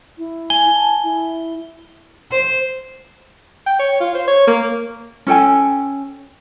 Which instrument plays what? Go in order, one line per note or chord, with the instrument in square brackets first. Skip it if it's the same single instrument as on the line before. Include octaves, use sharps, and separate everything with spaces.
[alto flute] E4
[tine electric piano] G#5 [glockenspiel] G7
[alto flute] A5
E4
[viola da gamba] C5
[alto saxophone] G5
C#5
F4
C5
C#5
A#3
[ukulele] C#4 A4 G5 G#5